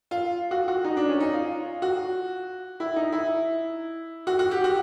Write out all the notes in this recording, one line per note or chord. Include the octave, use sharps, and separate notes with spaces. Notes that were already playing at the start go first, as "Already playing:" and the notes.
F4
F#4
F#4
D#4
D4
C#4
D#4
F4
F#4
E4
D#4
E4
F#4
F#4
G4
F#4